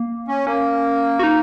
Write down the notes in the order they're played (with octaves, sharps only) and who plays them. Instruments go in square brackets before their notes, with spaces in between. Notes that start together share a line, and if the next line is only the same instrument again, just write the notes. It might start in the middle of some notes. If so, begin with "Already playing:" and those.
Already playing: [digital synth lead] A#3
[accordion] C#4
[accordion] A#3 [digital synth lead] C#4
[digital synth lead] F#4
D#4